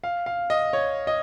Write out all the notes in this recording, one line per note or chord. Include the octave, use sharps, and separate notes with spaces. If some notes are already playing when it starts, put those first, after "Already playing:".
F5
F5
D#5
C#5
D#5